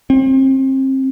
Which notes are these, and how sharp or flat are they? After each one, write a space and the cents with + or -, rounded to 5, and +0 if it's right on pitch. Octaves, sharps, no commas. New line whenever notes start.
C4 +30